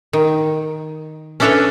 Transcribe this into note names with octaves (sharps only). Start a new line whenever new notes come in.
D#3
C#4 D4 E4 A4 B4 C#5